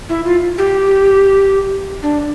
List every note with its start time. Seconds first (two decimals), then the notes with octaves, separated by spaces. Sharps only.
0.09 E4
0.25 F4
0.58 G4
2.02 D4